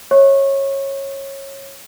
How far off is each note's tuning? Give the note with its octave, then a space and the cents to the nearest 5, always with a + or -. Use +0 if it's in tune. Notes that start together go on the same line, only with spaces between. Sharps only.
C#5 -20 E5 -30 C#6 -25